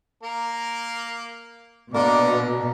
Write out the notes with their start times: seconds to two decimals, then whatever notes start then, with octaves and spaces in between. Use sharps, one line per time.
0.23 A#3 A#4
1.94 B2 D3 A#3 D5 D6